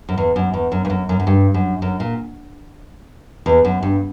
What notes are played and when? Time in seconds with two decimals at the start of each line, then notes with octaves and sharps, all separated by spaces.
0.09 F#2
0.18 E2
0.36 F#2
0.54 E2
0.72 F#2
0.85 G2
0.90 F#2
1.09 F#2
1.20 F#2
1.27 G2
1.54 F#2
1.82 F#2
2.00 A#2
3.46 E2
3.65 F#2
3.83 G2